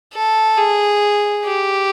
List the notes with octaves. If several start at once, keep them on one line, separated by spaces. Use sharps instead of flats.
A4
G#4
G4